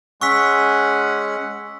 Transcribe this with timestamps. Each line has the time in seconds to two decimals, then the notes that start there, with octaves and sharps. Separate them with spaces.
0.21 G#3 C#4 F#5 C#6 E6 B6